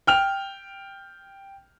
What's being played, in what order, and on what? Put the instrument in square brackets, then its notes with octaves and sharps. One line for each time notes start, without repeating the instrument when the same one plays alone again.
[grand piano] G5 F6 F7